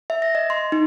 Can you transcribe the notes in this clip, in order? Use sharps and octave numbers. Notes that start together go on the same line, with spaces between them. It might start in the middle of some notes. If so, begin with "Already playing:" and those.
E5
A#6
D#5
C6
D#4